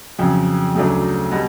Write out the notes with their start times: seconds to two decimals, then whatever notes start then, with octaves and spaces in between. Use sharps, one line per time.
0.19 F2 C#3 F#3
0.75 D2 C#3 F#3 A3 D4
1.32 B2 G3